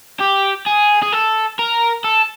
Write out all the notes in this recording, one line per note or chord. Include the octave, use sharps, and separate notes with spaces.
G4
G#4
G#4
A4
A#4
A4